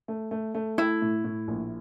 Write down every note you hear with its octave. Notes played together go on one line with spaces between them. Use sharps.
A3
A3
A3
A3 E4
A2
A2
A#1